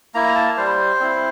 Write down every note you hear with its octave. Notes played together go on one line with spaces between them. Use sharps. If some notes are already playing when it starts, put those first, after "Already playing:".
A#3 E4 A#5
A5
G3 C5
C4 E4